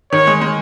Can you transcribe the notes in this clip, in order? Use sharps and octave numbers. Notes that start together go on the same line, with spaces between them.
D#3 C#5
G#3
G#3